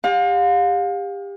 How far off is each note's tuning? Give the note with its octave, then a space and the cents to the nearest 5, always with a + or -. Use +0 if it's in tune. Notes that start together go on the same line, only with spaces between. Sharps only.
G4 +30 F5 +35